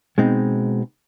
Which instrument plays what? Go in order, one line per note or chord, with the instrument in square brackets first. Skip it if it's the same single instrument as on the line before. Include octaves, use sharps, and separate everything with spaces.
[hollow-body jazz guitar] B2 G#3 C4 D#4